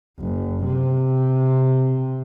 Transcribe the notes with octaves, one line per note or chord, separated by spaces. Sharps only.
F#1
C3